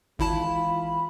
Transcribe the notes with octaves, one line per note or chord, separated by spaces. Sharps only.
G#1 E3 G#3 E4 F4 A5 B5